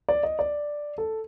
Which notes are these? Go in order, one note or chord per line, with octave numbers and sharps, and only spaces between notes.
D5
D#5
D5
A4